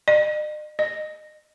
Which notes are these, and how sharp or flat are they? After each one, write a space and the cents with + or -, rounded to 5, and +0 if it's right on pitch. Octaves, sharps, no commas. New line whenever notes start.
D#5 -45
D#5 -30